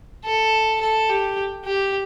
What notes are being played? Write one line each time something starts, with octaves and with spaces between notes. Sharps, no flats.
A4
A4
G4
G4